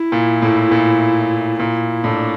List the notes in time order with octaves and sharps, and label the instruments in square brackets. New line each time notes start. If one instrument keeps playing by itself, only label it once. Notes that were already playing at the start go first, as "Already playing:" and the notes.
Already playing: [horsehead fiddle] E4
[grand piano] A#2
A2
A#2
[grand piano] A#2 [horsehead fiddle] E4
[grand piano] A2 [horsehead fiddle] D4